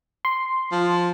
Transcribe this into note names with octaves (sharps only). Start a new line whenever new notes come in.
C6
F3